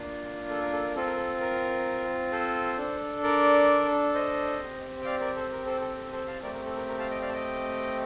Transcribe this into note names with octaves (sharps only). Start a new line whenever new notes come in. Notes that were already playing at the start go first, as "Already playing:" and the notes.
Already playing: A#3 D4 F4
A4
A#4
A4
A#4
C4 F4 A4
A#4
A4
A#4
A4 C5
D4 A4
A#4 D5
C5 D#5
C4 G4
G5
D5 F5
A#4 D5
A4 C5
A#4
A4 C5
A4
A4
A4 C5
F5 A5
A3 C4 G4 A#4 D5
A#4
A4
A#4
A#4
F5 A5
D#5 G5
D5 F5
A5
D#5 G5